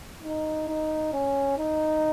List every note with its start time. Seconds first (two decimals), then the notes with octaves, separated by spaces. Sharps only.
0.23 D#4
0.68 D#4
1.13 C#4
1.58 D#4